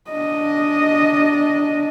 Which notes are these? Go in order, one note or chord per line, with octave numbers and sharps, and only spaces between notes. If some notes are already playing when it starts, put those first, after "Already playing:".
D4 D#5